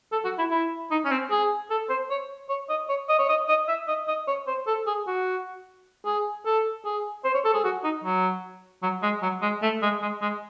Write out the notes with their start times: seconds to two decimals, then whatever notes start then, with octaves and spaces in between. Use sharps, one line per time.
0.12 A4
0.25 F#4
0.38 E4
0.51 E4
0.91 D#4
1.05 C#4
1.11 C4
1.31 G#4
1.71 A4
1.90 C5
2.10 C#5
2.49 C#5
2.70 D#5
2.89 C#5
3.09 D#5
3.19 C#5
3.29 D#5
3.49 D#5
3.68 E5
3.88 D#5
4.08 D#5
4.28 C#5
4.47 C5
4.67 A4
4.87 G#4
5.07 F#4
6.06 G#4
6.46 A4
6.85 G#4
7.25 C5
7.34 C#5
7.45 A4
7.54 G#4
7.64 F#4
7.84 D#4
8.04 F#3
8.83 F#3
9.03 G#3
9.22 F#3
9.42 G#3
9.62 A3
9.82 G#3
10.02 G#3
10.22 G#3